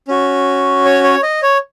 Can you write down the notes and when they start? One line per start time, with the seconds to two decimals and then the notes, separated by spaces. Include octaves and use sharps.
0.08 C#4 F#4
0.85 C#5
1.04 C#5
1.23 D#5
1.43 C#5